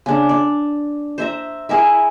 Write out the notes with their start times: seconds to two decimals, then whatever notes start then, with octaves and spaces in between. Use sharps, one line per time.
0.06 C#3 D4
0.29 D5
1.18 C5 E5 A#5
1.69 E4 G#4 A#4 E5